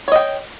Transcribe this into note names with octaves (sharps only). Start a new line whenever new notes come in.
C#5 D#5 G5